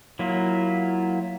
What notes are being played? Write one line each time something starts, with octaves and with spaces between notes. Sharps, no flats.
F#3 A#3 E4 F4